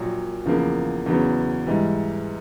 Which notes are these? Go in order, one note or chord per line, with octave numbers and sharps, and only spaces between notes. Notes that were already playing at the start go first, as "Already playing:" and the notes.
Already playing: A#1 A#2 F#3
E2 C#3 F3 A#3
E2 C#3 F#3 B3
G#2 E3 G3